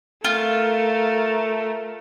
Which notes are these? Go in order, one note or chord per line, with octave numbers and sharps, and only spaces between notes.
A3 F4 A#4